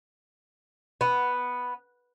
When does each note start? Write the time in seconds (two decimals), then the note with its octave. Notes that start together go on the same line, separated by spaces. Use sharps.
1.01 B3